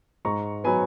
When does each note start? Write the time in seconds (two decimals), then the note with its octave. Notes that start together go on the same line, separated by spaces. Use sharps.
0.25 G#2 A#5 C#6
0.64 F#3 B3 G#5 B5